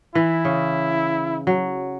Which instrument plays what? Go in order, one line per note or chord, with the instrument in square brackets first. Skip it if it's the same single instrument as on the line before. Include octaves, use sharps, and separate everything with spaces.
[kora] E3 [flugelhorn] E4
[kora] C#3
F#3